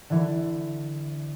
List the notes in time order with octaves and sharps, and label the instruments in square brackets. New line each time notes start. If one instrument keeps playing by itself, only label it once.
[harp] D3 E3